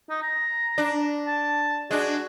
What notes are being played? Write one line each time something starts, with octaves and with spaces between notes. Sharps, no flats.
D#4
A#5
D4
A5
G#3 D4 F#4